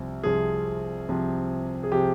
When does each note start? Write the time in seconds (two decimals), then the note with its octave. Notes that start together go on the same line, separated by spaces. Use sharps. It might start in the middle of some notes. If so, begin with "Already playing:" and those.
Already playing: C2 C3 F3
0.23 C2 C3 F3 G#4
1.09 C2 C3 F3
1.83 G#4
1.92 C3 F3 G4